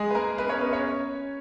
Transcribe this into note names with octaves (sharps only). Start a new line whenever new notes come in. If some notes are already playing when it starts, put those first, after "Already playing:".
Already playing: G#3 G#4
B4
A#3 A#4
B3 B4
C#4 C#5
B3 B4
C#4 C#5